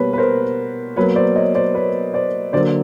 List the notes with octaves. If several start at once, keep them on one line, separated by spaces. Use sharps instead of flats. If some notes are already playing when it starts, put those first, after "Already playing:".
Already playing: B2 G3 A#3 B4 C#5
B4
A#4 C5
B2 F#3 A#3 B4 C#5
C5 D5
C#5 D#5
C5 D5
B4 C#5
C5 D5
D3 F#3 A#3 C5 D5